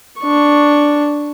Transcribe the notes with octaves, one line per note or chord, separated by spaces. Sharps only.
D4 C#6